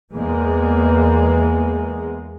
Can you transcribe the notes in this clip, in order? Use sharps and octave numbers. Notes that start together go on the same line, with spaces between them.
E2 G#3 A#3